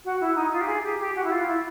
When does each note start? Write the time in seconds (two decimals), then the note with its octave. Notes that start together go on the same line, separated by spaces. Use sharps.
0.04 F#4
0.20 E4
0.35 D#4
0.52 F4
0.61 G4
0.67 G#4
0.83 G4
0.99 G4
1.15 F#4
1.24 E4
1.31 F4
1.47 E4